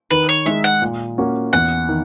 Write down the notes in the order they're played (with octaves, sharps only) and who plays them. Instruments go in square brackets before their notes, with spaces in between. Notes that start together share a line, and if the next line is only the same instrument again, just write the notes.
[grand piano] D#3 [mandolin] B4
[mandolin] C#5
[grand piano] G#3 D#4 G#4 [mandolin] E5
[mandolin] F#5
[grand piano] A#2
A#3 C#4 F#4
[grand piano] E2 [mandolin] F#5
[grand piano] D#3